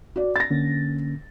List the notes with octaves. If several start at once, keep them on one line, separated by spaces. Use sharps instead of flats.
F#4 D5
A6 A#6
D3 A#3 C#4